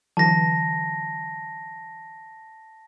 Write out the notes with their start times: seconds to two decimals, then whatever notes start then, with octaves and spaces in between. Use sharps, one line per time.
0.17 D3 E3 F#3 A5 A#6